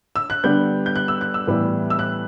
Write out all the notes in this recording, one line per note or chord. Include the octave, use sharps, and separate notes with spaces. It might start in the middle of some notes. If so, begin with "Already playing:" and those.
E6
F#6
D3 G3 B3 G6
G6
F#6
E6
F#6
E6
A2 E3 G3 B3
E6
F#6